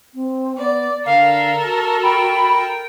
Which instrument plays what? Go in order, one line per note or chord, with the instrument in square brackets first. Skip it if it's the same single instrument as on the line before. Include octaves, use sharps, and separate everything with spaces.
[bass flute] C4
[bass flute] B3 [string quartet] D5
[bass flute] D3 [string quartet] A4 A#4 [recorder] F5
[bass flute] F#4 [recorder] A5
[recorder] G5 [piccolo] B5